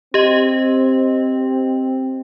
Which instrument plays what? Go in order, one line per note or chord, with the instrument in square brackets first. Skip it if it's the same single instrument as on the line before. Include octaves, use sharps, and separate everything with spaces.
[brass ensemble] C4 [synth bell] G4 D#5